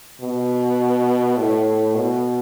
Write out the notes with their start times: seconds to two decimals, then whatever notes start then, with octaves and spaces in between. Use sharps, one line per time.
0.21 B2
1.37 A2
1.96 B2